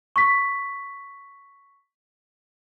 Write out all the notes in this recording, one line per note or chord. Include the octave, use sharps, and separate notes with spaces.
C#6 B6